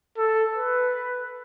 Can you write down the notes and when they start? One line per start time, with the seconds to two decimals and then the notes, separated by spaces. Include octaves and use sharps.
0.18 A4
0.55 B4